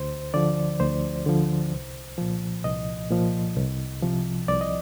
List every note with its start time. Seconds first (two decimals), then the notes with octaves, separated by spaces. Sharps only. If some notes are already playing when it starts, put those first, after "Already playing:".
Already playing: D2 C5
0.34 D3 F3 D5
0.80 D2 C5
1.26 D3 F3
1.73 C2
2.18 A#2 F3
2.64 C2 D#5
3.10 A#2 F3
3.56 C2
4.03 C3 F3
4.48 C2 D5
4.61 D#5